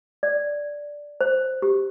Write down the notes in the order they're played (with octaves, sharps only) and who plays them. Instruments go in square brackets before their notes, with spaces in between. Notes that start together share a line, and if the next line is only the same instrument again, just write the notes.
[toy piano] D5
C5
G4